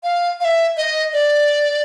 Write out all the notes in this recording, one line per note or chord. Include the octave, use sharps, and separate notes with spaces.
F5
F5
E5
D#5
D5